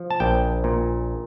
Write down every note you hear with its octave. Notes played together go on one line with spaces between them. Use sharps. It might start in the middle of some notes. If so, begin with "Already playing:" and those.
Already playing: F3
A5
A#1 G5
A#2